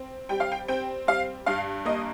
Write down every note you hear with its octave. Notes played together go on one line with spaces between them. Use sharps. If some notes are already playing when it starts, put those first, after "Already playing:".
Already playing: C4
G3 G5
F5
G5
C4 G5
G3 F5
G2 F5
A#3 D#5